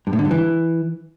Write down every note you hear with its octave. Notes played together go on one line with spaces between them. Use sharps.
G2
A2
D3
G2
E3